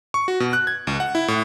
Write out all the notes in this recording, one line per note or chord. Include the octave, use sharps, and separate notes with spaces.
C#6
F#4
B2
F#6
G#6
C#2
F#5
E4
A2